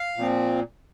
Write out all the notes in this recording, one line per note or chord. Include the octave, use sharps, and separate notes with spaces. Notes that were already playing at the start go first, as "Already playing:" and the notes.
Already playing: F5
A#2 F3 C4